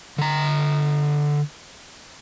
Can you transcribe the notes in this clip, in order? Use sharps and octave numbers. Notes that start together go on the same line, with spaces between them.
D3 A#5